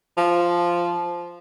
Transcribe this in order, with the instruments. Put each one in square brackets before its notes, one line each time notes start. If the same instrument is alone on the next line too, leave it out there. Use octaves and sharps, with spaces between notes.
[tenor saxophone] F3